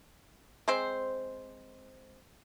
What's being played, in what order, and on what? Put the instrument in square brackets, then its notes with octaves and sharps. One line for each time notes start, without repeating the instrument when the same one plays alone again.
[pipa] G#3 C4 C5